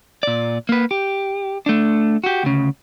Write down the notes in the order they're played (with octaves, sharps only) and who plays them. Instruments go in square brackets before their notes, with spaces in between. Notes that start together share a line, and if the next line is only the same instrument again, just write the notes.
[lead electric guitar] A#2 D5
A#3 B4
G4
A3 D4
F#4 G4
D2 C#3